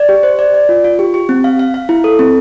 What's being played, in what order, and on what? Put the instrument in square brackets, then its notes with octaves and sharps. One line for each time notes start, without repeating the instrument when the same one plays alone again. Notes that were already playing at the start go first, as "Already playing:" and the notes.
Already playing: [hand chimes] D5
G4
C5
D5
D5
F4
F4
G4
G4
C4
F5
F5
F5
E4
A4
C4